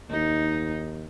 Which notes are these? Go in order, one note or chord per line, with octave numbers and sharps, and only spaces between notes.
D#2 D#4